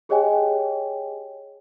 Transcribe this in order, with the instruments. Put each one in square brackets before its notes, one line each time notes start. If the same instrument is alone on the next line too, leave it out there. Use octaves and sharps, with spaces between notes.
[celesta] G4 G#4 C#5 D#5 G5 G#5